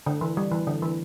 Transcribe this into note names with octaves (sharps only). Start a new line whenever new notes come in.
D3
E3
G3
E3
D3
E3